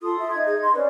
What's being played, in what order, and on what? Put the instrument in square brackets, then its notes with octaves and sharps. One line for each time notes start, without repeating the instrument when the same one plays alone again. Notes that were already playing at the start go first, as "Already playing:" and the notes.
[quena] F4 [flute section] A4 C6 D#6
[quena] E5
[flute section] D#4 G#6
[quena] G#4
C6
[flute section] C#4 C5 D5 [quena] B4